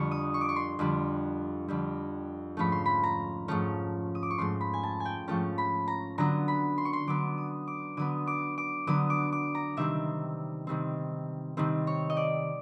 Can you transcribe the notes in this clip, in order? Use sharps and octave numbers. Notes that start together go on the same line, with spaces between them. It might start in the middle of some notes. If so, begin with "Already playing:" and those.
Already playing: F2 D3 G3 C#6
D#6
C#6
D6
C#6
C6
F2 D3 G3
F2 D3 G3
G#2 F3 A3 C#4 B5
C6
B5
A#5
G#2 F3 A3 C#4
D#6
D6
C#6
G#2 F3 A3 C#4 C6
B5
G#5
A5
G#5
G5
G#2 F3 A3 C#4 A5
B5
A#5
D3 F#3 B3 A#5
B5
C6
C#6
C6
D3 F#3 B3 D6
D#6
D6
D3 F#3 B3 D#6
D6
D6
D3 F#3 B3 D#6
D6
D6
A#5
C3 D#3 G3 C4 E5
C3 D#3 G3 C4
C3 D#3 G3 C4
C#5
D#5
D5